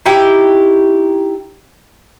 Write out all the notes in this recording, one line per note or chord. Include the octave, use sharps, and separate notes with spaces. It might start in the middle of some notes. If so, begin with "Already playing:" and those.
D#4 E4 G4 G5